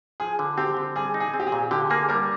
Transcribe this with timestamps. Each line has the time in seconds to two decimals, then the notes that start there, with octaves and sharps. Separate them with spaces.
0.20 F3 G#4
0.39 D3
0.58 C4 G4
0.77 D3
0.96 G3 G#4
1.14 D#4
1.20 G#4
1.34 C4
1.40 G4
1.47 G#4
1.52 A#2
1.71 D3 G4
1.90 A#3 G#4
2.09 G3 A#4